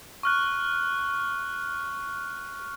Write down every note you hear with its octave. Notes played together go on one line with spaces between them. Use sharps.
C#6 F6 F#6